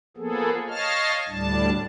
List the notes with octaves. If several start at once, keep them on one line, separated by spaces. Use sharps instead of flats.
F3 A#3 B3 G#4 A4
C#5 D#5 F5 A5 F6
D2 A2 G3 D4 A5